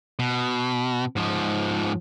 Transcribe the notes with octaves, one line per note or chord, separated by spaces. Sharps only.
B2
G#2 F3